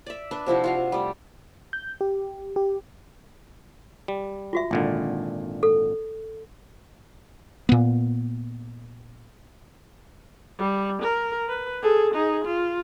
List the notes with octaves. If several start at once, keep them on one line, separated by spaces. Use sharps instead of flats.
D5 E5
D4 B4
C3 F3 E4 F#4
F4 F#4 F5
G3 A3
G6
G4
G4
G3
F4 F#4 E5
G#1 A#2 D3
A4
A#2 B3
G3
A#4
B4
G#4 A4
D#4 G#4
F4